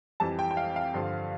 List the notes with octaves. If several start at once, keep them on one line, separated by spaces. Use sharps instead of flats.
F2 E3 G3 A5
G5
G5
F5
F5
G2 D3 F3